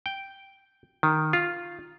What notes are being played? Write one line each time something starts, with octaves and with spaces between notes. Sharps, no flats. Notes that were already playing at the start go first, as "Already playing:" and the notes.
G5
D#3
F4